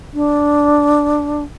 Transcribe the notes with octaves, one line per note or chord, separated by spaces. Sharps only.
D4